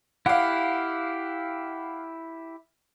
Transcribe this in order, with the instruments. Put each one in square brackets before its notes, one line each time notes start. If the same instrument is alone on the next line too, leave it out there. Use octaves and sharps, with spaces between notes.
[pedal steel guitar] E4 G4 [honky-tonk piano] F5 F#5